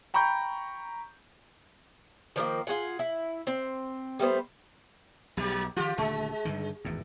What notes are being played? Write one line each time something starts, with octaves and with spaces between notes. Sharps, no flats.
G5 A#5 B5 C#6 G6
D#3 F3 G#3 A#3
F4 F#4 G#4 F#5
E4
C4
G3 A3 B3 C5
B1 F#3 G4
D#3 F3 F4 G4
D#1 D3 G#3 A3
G2 D3 D#3
G#1 E2 A2